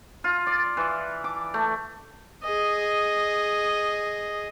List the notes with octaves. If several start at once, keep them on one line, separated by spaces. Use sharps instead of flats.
F4
D5
E3
D6
A3
G#4 D#5